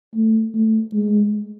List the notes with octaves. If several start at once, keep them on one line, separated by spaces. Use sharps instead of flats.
A3
A3
G#3